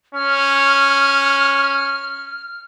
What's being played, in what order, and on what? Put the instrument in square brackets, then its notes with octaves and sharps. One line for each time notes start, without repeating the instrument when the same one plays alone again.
[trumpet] C#4 [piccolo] F6